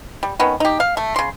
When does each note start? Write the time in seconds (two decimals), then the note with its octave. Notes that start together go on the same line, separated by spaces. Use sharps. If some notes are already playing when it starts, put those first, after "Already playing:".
0.23 G3
0.39 D#3 B3 C#4
0.60 D#4 G4
0.80 F5
0.97 A3
1.16 C#3 C6